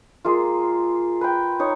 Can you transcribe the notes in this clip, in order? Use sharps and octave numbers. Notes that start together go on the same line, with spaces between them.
G#3 A#3 F4
B4 G5
D#4 C#5